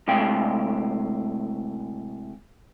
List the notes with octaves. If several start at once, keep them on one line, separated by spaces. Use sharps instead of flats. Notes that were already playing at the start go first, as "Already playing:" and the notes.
A2 C3 G#3 F5 G5